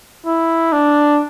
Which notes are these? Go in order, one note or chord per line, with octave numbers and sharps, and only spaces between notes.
E4
D4